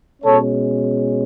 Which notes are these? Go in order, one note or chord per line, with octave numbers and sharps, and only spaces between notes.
B2 G#3 C#4 A4 C#5